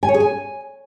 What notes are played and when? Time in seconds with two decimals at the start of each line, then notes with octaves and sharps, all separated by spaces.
0.03 G#5
0.09 C#5
0.14 G#4
0.20 G#5